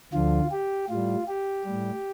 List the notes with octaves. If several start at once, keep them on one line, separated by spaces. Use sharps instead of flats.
D2 D3 F3 F4
G4
A2 G3 F4
G4
G3
A2